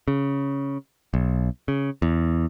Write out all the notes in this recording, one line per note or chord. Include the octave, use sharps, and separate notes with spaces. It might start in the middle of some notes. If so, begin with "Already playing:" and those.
C#3
B1
C#3
E2